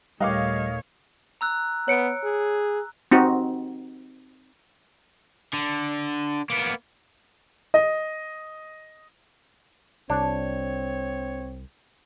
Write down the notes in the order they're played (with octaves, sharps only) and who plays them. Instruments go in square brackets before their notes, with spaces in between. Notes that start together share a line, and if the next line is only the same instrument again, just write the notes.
[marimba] D#2 A#2 [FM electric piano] G3 [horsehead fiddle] A3 C#5 [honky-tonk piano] D#5 F5
[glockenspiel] A#5 E6 F#6
[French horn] B3 [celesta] C#5 C#7 D7
[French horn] G#4
[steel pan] C4 D#4 F#4
[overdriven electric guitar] D3
A#3 B3
[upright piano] D#5
[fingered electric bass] C2 [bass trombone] C4 [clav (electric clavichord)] D4 [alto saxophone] C#5